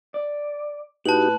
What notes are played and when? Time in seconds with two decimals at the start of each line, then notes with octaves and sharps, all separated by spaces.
0.14 D5
1.05 A2 D#4 F#4 G4 B4 A5 F#7